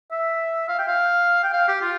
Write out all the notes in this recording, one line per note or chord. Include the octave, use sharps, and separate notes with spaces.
E5
F5
G5
F5
G5
F5
G4
F4